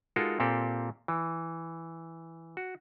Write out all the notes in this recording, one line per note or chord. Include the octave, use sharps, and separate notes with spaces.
G#3 D#4 F4 F#4 A4 A#4
A#2 A#3 C4 G4 A4
E3
F#4